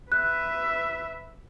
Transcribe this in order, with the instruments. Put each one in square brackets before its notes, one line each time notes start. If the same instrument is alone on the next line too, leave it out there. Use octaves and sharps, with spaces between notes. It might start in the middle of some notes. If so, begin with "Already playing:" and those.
[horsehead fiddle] B4 E5 [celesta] F#6